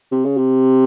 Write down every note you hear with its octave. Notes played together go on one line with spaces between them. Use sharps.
C3
C#3
C3